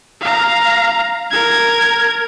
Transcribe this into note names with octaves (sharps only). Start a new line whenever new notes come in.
F5 A#5
A#4 G#6